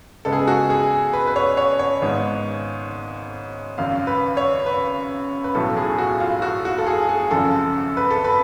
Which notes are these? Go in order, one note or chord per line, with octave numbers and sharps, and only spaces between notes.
C#2 C#3 G#3 B3 A4
G#4
A4
F#4
G#4
B4
B4
C#5
C#5
C#5
G#1 G#2 G#3 B3
G#1 F#2 C#3 F5
B4
C#5
B4
B4
B1 A2 F#3 A3 A4
G#4
F#4
F4
F#4
F#4
A4
G#4
G#4
G#1 F#2 C#3 F3 A4
B4
A4
B4